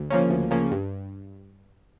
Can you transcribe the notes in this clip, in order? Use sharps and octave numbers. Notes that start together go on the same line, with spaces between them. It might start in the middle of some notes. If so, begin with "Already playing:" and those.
Already playing: D2
C#3 F3 A#3 C#4
D2
C#3 F3 A#3 C#4
G2